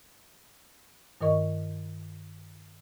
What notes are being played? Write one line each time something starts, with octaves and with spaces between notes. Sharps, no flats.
G2 D#3 A#4 D#5 C#6